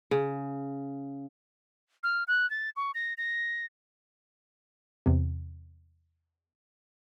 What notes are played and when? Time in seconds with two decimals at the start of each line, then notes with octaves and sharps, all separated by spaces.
0.11 C#3
2.03 F6
2.28 F#6
2.50 A6
2.76 C#6
2.95 A#6
3.18 A#6
5.06 E2 C3